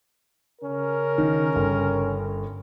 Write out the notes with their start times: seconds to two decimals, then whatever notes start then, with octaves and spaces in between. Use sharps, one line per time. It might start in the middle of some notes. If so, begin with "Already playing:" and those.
0.62 C#3 C#4 A#4
1.18 D#3
1.56 G1